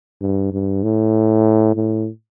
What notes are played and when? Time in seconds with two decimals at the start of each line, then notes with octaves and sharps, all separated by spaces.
0.21 G2
0.52 G2
0.83 A2
1.76 A2